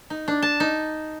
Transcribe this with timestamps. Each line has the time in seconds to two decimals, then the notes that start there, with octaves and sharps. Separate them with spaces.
0.10 D#4
0.28 D4
0.43 A5
0.60 D#4